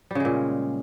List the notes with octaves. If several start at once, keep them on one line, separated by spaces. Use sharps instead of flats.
A#2 C#3 G3 G#3